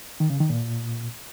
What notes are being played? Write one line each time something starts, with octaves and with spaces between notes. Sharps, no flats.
D#3
C#3
D#3
A#2